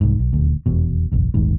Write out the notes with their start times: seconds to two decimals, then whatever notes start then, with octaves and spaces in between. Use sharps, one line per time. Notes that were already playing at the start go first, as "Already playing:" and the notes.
0.01 C2 G#2
0.19 B1
0.33 D#1 D2
0.66 F1 E2 B2
1.12 F#1 B1 E2
1.34 D1 G1 D#3 G#3